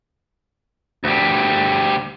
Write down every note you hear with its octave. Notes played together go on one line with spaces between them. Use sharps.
D2 G3